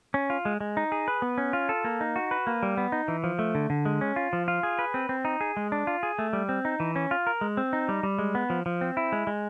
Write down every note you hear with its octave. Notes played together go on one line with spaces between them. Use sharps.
C#4
F4
G#3
G#3
D#4
G#4
B4
B3
C#4
F4
A4
A#3
D#4
F#4
B4
A#3
G3
B3
D#4
E3
F3
A3
D3
D3
G#3
C#4
F4
F3
F4
G#4
B4
C4
C4
D#4
G#4
G#3
D4
F4
G#4
A3
G3
C4
D#4
E3
C#4
F4
A#4
G#3
C4
D#4
G3
G3
G#3
B3
F3
F3
C4
E4
G#3
G#3